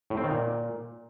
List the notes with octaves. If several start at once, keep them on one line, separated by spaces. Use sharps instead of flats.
A2
C4
D#3
A#2